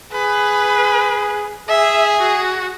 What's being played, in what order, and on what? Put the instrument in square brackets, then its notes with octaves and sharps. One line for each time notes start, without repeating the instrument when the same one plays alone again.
[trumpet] G#4 [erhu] B4
[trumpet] G#4 [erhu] E5
[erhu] F#4